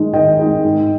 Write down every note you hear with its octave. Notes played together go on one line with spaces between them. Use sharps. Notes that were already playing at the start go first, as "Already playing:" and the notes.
Already playing: D#3 G#3 D#4
D#3 D#5 G5
G#3 D#4
G#2